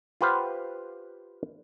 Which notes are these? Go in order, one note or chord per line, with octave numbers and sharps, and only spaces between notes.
F4 G4 B4 C5 F5 F#5